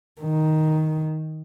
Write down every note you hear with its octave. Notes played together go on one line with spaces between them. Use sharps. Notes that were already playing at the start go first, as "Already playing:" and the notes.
D#3